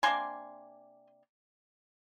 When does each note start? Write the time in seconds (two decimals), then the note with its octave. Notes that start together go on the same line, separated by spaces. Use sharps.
0.03 C3 D#3 A#3 D4 G#5 C6